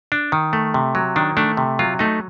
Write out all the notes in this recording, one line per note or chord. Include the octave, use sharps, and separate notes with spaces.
D4
D#3
A3
C3
F#3
D#3 D4
A3 D4
C3
F#3 F4
A3 D#4